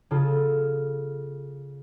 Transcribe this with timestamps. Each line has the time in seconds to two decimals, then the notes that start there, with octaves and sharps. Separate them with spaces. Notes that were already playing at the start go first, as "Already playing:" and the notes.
0.11 C#3 F4 A4 D#6